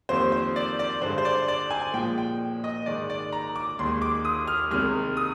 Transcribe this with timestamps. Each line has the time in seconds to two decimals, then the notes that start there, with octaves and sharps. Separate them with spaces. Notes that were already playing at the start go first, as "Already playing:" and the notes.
0.09 F2 D#3 G3 A#3 C5
0.32 C5
0.56 D5
0.79 D5
1.02 G2 D3 G#3 C5
1.18 C5
1.25 D5
1.48 D5
1.71 G#5
1.94 A#2 F3 G#3 G5
2.18 G5
2.64 D#5
2.86 G#2 D#3 G#3 D5
3.10 D5
3.33 A#5
3.56 D6
3.79 D#2 D#3 G#3 C6
4.02 D6
4.25 D#6
4.48 F6
4.71 C2 C3 D#3 G#3 F6
5.17 D#6